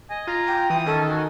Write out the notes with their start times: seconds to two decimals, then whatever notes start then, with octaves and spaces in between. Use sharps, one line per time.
0.10 D#5 G#5
0.27 F4 A#5
0.47 G5
0.70 E3 D#6
0.86 D#3 C#4 A4
1.10 F#4 G#5